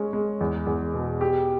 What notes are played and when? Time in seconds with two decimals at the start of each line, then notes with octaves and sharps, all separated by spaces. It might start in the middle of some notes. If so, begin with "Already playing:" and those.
Already playing: G#3 C#4
0.13 G#3
0.41 E2
0.67 E2
0.94 B2
1.21 G4